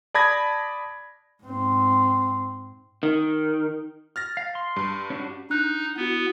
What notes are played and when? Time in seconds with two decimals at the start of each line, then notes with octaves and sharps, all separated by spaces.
0.14 D5 A5 B5 D#6 G#6 A#6
1.44 G#2 C4
3.03 D#3
4.16 F6 A6 A#6
4.37 F5
4.55 C6
4.76 G2
5.10 C#4 D4 F#4
5.50 D4 D#4 F#6
5.96 B3 E4 F#4